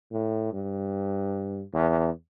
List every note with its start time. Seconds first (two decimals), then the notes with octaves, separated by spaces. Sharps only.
0.12 A2
0.53 G2
1.73 E2